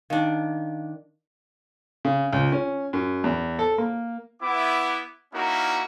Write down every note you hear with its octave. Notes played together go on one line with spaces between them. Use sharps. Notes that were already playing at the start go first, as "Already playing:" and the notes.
D#3 D4 D#4 F5
C#3
C#2
C#4
F#2
E2
A4
A#3
B3 E4 D6
A#3 C#4 D#4 E4 F#4 A#4